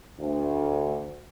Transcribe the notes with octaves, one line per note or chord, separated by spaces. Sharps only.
D2